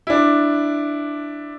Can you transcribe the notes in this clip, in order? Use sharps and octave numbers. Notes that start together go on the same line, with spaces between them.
D4 E4